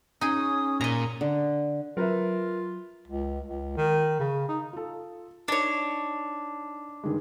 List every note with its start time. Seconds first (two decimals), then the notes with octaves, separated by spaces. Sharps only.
0.21 C#4 D#4 G#4 D#6
0.81 A#2 D#5 A#5
1.21 D3
1.97 F#3 F4 A#4 B4 E5
3.08 C#2
3.46 C#2
3.77 D#3
4.20 C#3
4.48 D#4
4.73 F4 A4
5.48 D4 D#4 C#5
7.04 G2 D#3 G#3